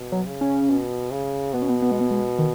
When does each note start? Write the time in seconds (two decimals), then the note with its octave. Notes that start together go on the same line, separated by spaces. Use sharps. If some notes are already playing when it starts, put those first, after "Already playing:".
Already playing: B2
0.12 F#3
0.26 C#3
0.41 C#4
0.69 B2
1.11 C#3
1.54 B2 B3
1.62 C#4
1.69 B3
1.82 B3
1.91 G#3
2.01 B3
2.11 G#3
2.39 D#3